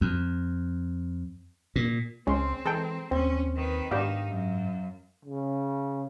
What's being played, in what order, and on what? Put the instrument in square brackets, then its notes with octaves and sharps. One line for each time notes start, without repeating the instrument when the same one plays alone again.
[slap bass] F2
A#2
[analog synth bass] C#2 [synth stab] G#3 [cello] C4 [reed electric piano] C#4 C6
[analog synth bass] E3 [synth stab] G#3 A4 G5 [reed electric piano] A#5
[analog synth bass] D#2 [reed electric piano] C4 [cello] C#4
[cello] D#3 B4
[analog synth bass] G#2 [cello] D#3 D#4 [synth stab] B3 D4 G4 [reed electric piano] F5
[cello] F#2
[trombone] C#3